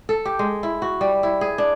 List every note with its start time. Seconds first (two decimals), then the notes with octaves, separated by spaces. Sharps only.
0.09 A4
0.25 G4
0.39 G#3
0.63 E4
0.82 F#4
1.01 G3
1.23 E4
1.41 G#4
1.58 D4